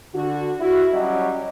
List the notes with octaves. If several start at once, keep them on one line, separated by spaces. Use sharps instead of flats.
D3 F#4
E4 F#4
F#3 G3 C#4 F#4 D5 D#5